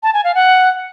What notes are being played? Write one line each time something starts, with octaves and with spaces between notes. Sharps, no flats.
A5
G#5
F5
F#5